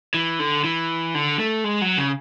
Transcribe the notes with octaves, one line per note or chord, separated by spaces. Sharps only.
E3
D3
E3
D3
A3
G#3
F#3
C#3